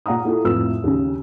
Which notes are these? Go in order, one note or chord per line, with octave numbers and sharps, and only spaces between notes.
A#2 F5 F#5 A#5 D#6
A#3 E4 F4 A4
F2 A2 E4 F4 B4 E6
D#2 C#3